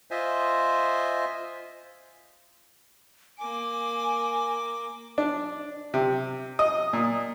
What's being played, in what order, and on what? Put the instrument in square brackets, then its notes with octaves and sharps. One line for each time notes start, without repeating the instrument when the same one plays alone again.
[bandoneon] F4 C5 D#5 E5 G#5
[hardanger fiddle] A#3 D6 [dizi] G#5
[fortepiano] D4
C3
D#5
A#2